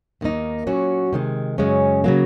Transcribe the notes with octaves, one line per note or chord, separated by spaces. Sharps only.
D#2 D#3 A#3 D#4
A#2 F#3 C#4 F#4
C3 D#3 G#3
F#2 C#3 G#3 C#4
C#3 F#3 A#3